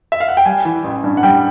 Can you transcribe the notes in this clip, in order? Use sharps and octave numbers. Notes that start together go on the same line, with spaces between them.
E5
F5
F#5
G5
G3 G#5
E3
A1
G2
F#5
G3 G5